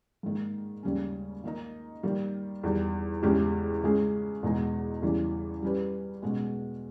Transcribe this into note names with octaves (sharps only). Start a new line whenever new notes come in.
G#2 D#3 A#3
D#2 C#3 G3 C#4
D#3 A#3 D#4
D#3 G3 A#3
E2 D#3 G3
E2 C#3 G#3 C#4 G4
C#3 G#3 C#4 G#4
E2 B2 G#3 D#4
E2 C#3 E3 G3
G3 C#4 G4 B4
B2 G#3 C#4